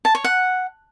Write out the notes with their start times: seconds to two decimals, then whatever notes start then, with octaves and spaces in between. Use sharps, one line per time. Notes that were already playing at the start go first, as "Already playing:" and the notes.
0.05 A5
0.15 C#5
0.24 F#5